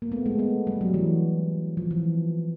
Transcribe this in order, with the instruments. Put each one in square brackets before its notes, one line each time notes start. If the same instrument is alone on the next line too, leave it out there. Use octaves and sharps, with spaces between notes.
[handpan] A#3
A3 B3
G#3 A#3
A3 B3
G3
F#3
E3
F3
E3